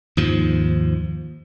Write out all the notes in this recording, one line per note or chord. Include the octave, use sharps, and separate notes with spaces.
D#2 G#2 F3